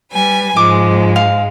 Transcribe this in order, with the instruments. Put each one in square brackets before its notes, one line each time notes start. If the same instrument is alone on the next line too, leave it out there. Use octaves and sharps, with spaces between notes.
[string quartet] G3 B4 G#5
[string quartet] G#2 G#3 [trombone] F3 [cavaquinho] D6
[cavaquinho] F5